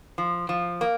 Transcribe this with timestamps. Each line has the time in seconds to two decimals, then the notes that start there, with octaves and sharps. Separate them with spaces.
0.18 F3
0.49 F3
0.81 A#3